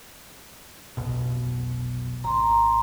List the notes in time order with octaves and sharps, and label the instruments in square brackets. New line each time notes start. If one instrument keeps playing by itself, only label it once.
[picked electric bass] F1 B1 B2
[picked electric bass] G#1 [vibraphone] A#5 C6